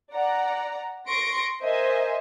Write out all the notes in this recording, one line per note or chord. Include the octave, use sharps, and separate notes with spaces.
D5 F#5 A#5
C6 C#6 A#6 C#7 D7
A#4 C5 D#5 E5 G#5